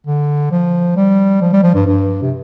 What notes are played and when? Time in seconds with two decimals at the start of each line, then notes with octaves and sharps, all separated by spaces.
0.07 D3
0.51 F3
0.96 G3
1.41 F3
1.53 G3
1.63 F3
1.74 G2
1.86 G2
2.22 C3